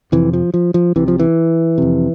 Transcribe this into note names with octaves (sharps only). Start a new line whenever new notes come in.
F2 C3 E3
F3
F3
F3
C2 C3 E3
F3
E3
F2 C3